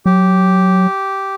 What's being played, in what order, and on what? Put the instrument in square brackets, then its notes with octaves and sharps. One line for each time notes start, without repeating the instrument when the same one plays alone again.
[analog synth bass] F#3 [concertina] G4